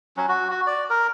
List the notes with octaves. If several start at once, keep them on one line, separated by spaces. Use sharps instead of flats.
F#3 C#4
F#4
F#4
D5
A#4